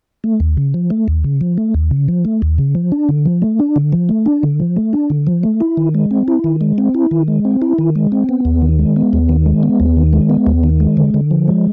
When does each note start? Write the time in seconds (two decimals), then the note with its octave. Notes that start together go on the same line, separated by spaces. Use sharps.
0.24 A3
0.40 D#2
0.57 C#3
0.74 F3
0.90 A3
1.08 D#2
1.24 C#3
1.41 F3
1.58 A3
1.74 D#2
1.91 C#3
2.08 F3
2.25 A3
2.42 D#2
2.58 C#3
2.75 F3
2.92 D4
3.09 D3
3.25 F3
3.42 A3
3.59 D4
3.76 D3
3.92 F3
4.09 A3
4.26 D4
4.43 D3
4.60 F3
4.76 A3
4.93 D4
5.10 D3
5.27 F3
5.43 A3
5.61 E4
5.77 D#3
5.95 G#3
6.11 C4
6.28 E4
6.44 D#3
6.61 G#3
6.78 C4
6.95 E4
7.11 D#3
7.28 G#3
7.45 C4
7.62 E4
7.78 D#3
7.96 G#3
8.12 C4
8.29 B3
8.45 D#2
8.62 D#3
8.79 G#3
8.96 B3
9.13 D#2
9.29 D#3
9.46 G#3
9.63 B3
9.80 D#2
9.97 D#3
10.13 G#3
10.30 B3
10.46 D#2
10.63 D#3
10.80 G#3
10.97 D3
11.14 D3
11.31 F3
11.48 G#3